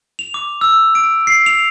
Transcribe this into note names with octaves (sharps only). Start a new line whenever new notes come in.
F7
D6
E6
D7
C7
F7